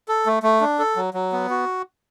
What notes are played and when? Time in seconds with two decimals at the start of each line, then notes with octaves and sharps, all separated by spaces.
0.08 A4
0.26 A3
0.43 A3
0.61 D4
0.79 A4
0.96 F#3
1.14 F#3
1.32 B3
1.50 F#4